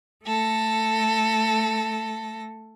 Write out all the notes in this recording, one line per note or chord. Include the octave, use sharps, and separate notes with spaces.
A3 A4 A#6